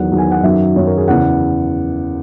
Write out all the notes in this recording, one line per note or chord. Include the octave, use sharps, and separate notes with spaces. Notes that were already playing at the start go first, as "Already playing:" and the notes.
Already playing: E2 D#3 F#3 F#5
E2 D#3 F#3
G#5
F#5
F#2 D#3 F#3 E5
F#2 D#3 F#3 C#5
A#4
G#4
E2 C#3 E3 F#5